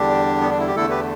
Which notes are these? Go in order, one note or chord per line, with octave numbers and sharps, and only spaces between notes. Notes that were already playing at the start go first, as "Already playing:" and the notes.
Already playing: E2 D3 G3 D4 G4
B3
D4
E4
G4
E2 D3 A3 E4 A4
G4 B4